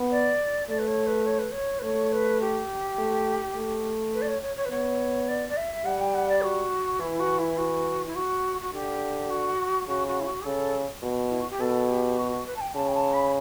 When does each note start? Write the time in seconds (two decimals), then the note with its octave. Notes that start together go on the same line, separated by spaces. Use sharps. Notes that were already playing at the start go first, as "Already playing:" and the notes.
Already playing: B3
0.11 D5
0.69 A3 D5
0.79 B4
0.88 C#5
1.07 B4
1.26 C#5
1.39 B4
1.52 C#5
1.79 B4
1.83 A3 C#5
2.12 B4
2.41 G4
2.99 A3
3.56 A3
4.14 B4
4.22 D5
4.28 C#5
4.42 C#5
4.56 C#5
4.65 B4
4.71 B3 C#5
5.28 D5
5.49 D5
5.57 E5
5.85 G3 F#5
6.01 G5
6.15 F#5
6.29 D5
6.43 F#4
7.00 E3 E4
7.20 F#4
7.39 E4
7.58 F#4
8.07 E4
8.15 F#4
8.61 F#4
8.73 D3 G4
9.30 F#4
9.88 C#3 F#4
10.07 F#4
10.21 E4
10.26 F#4
10.45 C#3 A4
11.02 B2
11.30 E4
11.40 F#4
11.50 G4
11.60 B2 A4
11.88 G4
12.18 F#4
12.32 F#4
12.46 B4
12.56 A5
12.61 G5
12.75 C#3 A5
12.88 G5
12.95 A5
13.13 B5